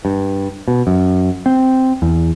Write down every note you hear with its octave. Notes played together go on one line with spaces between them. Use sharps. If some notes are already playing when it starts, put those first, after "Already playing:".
G2
B2
F#2
C4
E2